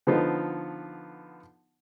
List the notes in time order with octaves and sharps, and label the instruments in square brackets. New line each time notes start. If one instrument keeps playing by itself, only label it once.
[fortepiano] D3 F3 B3 D#4 F4